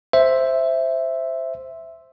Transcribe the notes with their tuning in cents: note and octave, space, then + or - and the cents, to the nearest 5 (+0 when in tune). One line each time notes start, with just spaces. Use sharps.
C5 +0 E5 +0